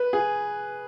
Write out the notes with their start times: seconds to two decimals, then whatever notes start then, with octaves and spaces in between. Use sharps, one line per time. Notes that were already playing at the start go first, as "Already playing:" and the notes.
Already playing: B4
0.13 G#4